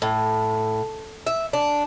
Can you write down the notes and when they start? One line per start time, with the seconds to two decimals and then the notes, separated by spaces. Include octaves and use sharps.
0.02 A2
1.27 E5
1.53 D4